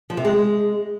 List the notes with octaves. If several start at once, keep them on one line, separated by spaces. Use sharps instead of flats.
F3
C3
G#3